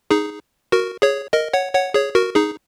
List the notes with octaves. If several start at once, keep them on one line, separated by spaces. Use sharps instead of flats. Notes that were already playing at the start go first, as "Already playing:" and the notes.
D#4 G#4
F#4 A#4
G#4 C#5
A#4 D#5
C#5 F#5
C#5 F#5
G#4 C#5
F#4 A#4
D#4 G#4